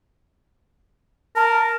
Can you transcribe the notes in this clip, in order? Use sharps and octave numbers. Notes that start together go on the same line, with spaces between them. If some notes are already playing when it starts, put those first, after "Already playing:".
A#4 A5